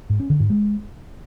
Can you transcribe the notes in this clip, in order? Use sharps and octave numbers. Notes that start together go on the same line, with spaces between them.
G#2
C#4
D3
G#2
G#3